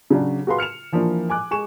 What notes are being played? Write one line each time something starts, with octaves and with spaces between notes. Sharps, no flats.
C#3 F#3 D4
F#4 G#4 B4 F5 C6
F6 C#7 E7 F7
E3 F3 A#3 D4
G#5 D6 F#6
G#3 G#5 C#6 E7